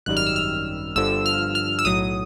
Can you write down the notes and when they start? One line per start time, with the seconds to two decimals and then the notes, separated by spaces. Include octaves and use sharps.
0.06 G#1 F#2 D#3 G3 F#6
0.17 F6
0.26 E6
0.36 F6
0.96 G1 G2 D3 F3 E6
1.26 F6
1.55 F6
1.79 E6
1.85 B1 A2 F#3 D#6